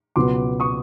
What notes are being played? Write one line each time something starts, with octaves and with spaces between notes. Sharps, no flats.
C#2 B2 F#3 B3 C6 D6
C#6 D#6